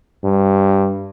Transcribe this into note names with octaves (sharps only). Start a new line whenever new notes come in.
G2